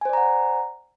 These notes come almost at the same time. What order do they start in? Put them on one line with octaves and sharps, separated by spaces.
G#5 C5 D5 A#5 F#5